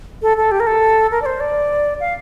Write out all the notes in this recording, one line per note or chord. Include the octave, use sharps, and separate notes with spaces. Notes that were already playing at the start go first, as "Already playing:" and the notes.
A4
A4
G4
A#4
A4
A#4
D5
C5
D5
F5